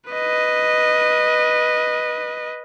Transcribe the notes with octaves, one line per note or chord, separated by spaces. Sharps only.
B4 D#5